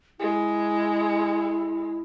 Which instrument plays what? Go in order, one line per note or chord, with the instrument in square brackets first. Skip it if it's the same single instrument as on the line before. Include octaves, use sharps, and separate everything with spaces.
[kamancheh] G#3 [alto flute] E4